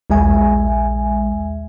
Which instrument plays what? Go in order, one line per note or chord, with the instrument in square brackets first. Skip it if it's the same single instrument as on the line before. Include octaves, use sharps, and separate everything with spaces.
[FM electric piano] A#1 D#2 G#3 E5 G#5